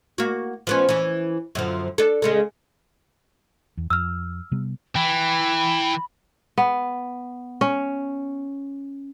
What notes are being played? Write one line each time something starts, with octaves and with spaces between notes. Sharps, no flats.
A#3 F#4
F3 B3 C#4
E3 C#4
F#2 D3 F3
D4 A4
C#3 G#3 A4
E2
F2 E6 F6
C3 G3 B3
E3 G5 B5
B3
C#4